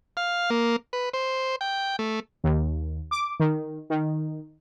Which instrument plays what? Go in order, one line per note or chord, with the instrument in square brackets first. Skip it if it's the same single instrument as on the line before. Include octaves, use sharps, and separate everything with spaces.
[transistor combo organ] F5
A#3
B4
C5
G5
A3
[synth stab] D#2
D6
D#3
D#3